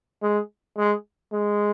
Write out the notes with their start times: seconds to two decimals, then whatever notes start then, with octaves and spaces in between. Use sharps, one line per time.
0.22 G#3
0.77 G#3
1.33 G#3